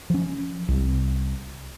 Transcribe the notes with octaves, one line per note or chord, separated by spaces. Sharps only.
F3 C#4
C2